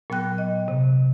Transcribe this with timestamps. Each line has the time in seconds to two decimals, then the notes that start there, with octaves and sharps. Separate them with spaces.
0.10 A#2 F#3 B3 G5 F#6 A#6
0.38 D#5
0.68 C3